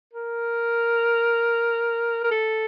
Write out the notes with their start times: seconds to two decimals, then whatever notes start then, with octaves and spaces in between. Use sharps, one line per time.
0.13 A#4
2.24 A#4
2.31 A4